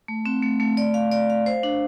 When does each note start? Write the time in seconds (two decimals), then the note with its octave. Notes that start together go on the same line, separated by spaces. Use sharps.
0.08 A3
0.26 C4
0.42 A3
0.60 A3
0.77 D5
0.94 F5
1.12 D5
1.30 F5
1.46 C5
1.63 D4